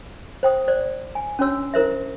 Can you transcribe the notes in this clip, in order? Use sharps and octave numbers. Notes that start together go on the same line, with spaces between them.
C5 G5 D#6
C5 D5
G#5
C#4 D4 F#4 C#5 E6
E4 A#4 C5 E5